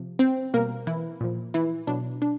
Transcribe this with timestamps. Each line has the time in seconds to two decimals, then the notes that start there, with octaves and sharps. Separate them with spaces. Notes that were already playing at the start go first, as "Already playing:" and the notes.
Already playing: C3 F3
0.19 C4 C5
0.54 B2 G3 A#3 A#4
0.87 E3 E4
1.21 A#2 F3
1.54 E3 E4
1.87 B2 F#3 D4
2.22 D4